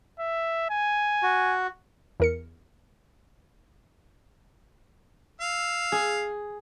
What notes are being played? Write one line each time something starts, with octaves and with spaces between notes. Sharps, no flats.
E5
G#5
F#4
E2 A#4 C#7
F5 E6
G#4